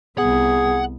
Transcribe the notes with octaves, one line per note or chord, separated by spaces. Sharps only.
C2 B3 G#4 F#5